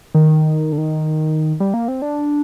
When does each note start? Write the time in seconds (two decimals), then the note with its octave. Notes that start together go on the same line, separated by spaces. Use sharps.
0.14 D#3
0.72 D3
0.78 D#3
1.60 G3
1.74 A#3
1.88 C4
2.02 D4